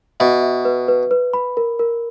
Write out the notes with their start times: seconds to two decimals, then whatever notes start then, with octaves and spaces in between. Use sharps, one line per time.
0.20 B2 E5
0.42 E5
0.65 B4
0.88 B4
1.11 B4
1.33 B5
1.57 A#4
1.79 A#4